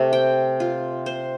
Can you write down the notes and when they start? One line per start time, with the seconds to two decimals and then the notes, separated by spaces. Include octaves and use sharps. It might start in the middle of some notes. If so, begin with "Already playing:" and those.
Already playing: C3 A3 C4
0.13 G5
0.60 F4
1.06 C5